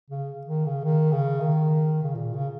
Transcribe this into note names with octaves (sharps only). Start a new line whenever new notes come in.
C#3
D#3
C#3
D#3
C#3
D#3
C#3
A#2
C#3